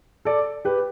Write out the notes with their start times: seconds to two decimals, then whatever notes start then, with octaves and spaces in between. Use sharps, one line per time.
0.25 A4 D5
0.65 G4 B4